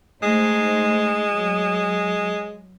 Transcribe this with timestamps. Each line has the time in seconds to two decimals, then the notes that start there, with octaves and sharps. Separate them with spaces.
0.22 G#3 A3 D#4 C5
1.31 F#3